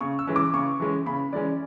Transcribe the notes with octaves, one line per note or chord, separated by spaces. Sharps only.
C#3 C#6
E6
E3 G#3 C#4
D6
C#3 C#6
E3 G#3 C#4
C#3 B5
E3 G#3 C#4 D5